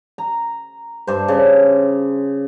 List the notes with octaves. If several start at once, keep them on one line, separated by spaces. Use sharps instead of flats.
A#5
G2 C5
C#3